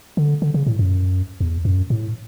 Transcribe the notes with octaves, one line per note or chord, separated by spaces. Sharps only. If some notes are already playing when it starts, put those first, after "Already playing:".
D3
D3
C#3
A2
F#2
E2
F#2
A2